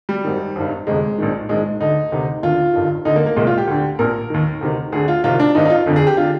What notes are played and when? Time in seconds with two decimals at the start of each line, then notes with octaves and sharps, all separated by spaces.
0.09 G3
0.24 G#1 G#2 D#3
0.56 G#1 G2 D#3
0.87 G1 F2 C3 G#3
1.18 A#1 G#2 D#3
1.49 A#1 G#2 D#3 G#3
1.81 D2 D3 D#4
2.12 D2 C3 D#3
2.43 D#2 D3 F4
2.74 G1 G2 D#3
3.05 D2 D3 D#4
3.16 A#3
3.26 A#3
3.36 C2 A#2 G#3
3.47 F4
3.58 G4
3.67 D2 D3
3.99 A#1 A#2 A#4
4.30 D#2 D#3
4.61 D2 C3 D#3
4.92 D2 D3 G#4
5.08 F4
5.24 C2 C3 D#3 F4
5.40 D4
5.55 G#1 G2 D#3 D#4
5.65 D#4
5.70 F4
5.86 G1 F2 D3
5.96 G#4
6.07 G4
6.17 D3 F4